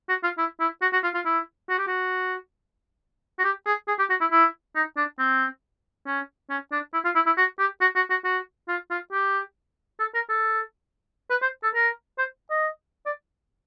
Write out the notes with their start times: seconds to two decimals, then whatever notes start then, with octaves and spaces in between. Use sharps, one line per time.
0.09 F#4
0.23 F4
0.38 E4
0.60 E4
0.82 F#4
0.93 F#4
1.03 F4
1.15 F4
1.25 E4
1.69 F#4
1.78 G4
1.87 F#4
3.39 F#4
3.44 G4
3.66 G#4
3.88 G#4
3.99 G4
4.09 F#4
4.21 E4
4.31 E4
4.75 D#4
4.97 D4
5.19 C4
6.06 C#4
6.50 C#4
6.72 D4
6.93 E4
7.05 F4
7.15 E4
7.26 E4
7.37 F#4
7.59 G4
7.81 F#4
7.96 F#4
8.10 F#4
8.24 F#4
8.68 F4
8.90 F4
9.12 G4
9.99 A4
10.14 A#4
10.29 A4
11.30 B4
11.42 C5
11.63 A4
11.75 A#4
12.18 C5
12.50 D#5
13.06 D5